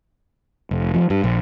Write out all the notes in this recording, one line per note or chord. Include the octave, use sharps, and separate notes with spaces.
F1
F3
G2
A#1